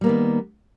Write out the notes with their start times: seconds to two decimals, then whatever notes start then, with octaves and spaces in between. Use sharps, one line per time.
0.01 G3
0.04 A#3
0.06 B3
0.09 D#3